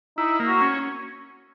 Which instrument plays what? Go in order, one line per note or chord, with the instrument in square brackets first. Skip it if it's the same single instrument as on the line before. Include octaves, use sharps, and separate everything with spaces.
[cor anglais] D#4 [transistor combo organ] E4
[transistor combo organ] A#3
[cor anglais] F#4
[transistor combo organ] C#4